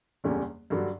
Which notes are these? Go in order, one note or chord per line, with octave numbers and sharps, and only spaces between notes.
F#1 E2 D3 G3 C#4
G2 D3 F#3